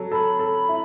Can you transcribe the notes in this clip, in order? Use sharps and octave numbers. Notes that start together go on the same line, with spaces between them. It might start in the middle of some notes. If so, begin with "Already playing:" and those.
Already playing: F#3 A4
A4 B5
A4
E4